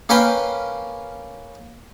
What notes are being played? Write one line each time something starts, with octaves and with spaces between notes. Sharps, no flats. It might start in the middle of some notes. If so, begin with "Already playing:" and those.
A#3 C#4 A#4 B4 F5 G5